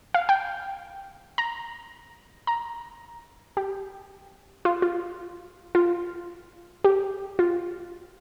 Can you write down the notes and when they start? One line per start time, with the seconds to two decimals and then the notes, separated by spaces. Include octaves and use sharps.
0.14 F5
0.29 G5
1.38 A#5
2.47 A#5
3.57 G4
4.65 F4
4.82 F4
5.75 F4
6.84 G4
7.39 F4